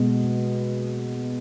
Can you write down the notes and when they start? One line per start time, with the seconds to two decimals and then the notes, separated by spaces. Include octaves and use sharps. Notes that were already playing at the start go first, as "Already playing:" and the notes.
Already playing: B2 G#3 B3